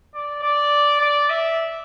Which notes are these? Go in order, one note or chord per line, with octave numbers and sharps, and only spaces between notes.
D5
D5
D5
E5